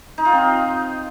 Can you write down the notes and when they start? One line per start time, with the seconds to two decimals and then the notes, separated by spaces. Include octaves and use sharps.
0.18 D#4
0.25 F4
0.33 C4